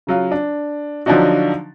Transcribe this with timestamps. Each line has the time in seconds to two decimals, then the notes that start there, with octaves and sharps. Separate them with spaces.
0.07 C#3 F#3 F4
0.32 D4
1.06 D3 F3 F#3 D4 D#4 F#4